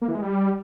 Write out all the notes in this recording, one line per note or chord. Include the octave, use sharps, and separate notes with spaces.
A#3
E3
G#3
G3